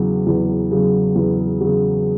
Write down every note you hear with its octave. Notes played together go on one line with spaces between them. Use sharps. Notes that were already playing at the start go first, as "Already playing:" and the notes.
Already playing: E2 C#3 F#3
E2
C#3 F#3
E2
C#3 F#3